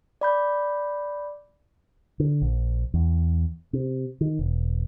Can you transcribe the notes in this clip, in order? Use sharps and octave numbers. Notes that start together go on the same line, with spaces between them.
D5 B5 G6
D3
A#1
E2
C3
D#3
E1